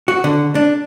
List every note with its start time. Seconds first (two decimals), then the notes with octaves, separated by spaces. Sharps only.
0.08 F#4
0.24 D3
0.55 D4